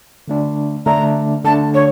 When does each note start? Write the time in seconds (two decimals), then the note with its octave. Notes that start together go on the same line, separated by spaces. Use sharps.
0.28 D3 A3 D4
0.86 D3 A3 D4 A#5
1.45 D3 A3 D4 A5
1.74 C#5